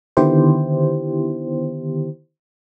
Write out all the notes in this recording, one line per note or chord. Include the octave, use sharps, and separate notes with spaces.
D3 D#3 B3 E4 G4 C5